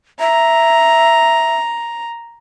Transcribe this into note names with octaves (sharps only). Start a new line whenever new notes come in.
E5 A#5